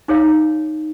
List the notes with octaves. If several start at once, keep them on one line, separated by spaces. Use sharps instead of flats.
D#4 G#4 C#5 F5